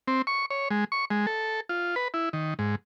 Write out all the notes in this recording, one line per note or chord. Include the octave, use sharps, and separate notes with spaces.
C4
C#6
C#5
G#3
C#6
G#3
A4
F4
B4
E4
D#3
G#2